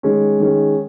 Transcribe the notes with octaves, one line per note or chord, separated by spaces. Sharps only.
D#3 G#3 C#4
D#3 G#3 C#4